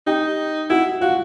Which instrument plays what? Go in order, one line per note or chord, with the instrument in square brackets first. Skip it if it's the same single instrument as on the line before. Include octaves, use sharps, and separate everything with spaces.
[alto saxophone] D#4 [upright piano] G4 G5
[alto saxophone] E4 [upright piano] F#4 F#5
[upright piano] F4 F5 [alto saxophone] F#4